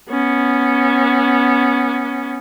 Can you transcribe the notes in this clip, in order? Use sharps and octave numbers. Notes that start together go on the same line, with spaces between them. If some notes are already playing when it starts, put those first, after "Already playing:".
B3 C#4